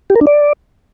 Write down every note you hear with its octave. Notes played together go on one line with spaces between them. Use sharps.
G4
A#4
D4
D5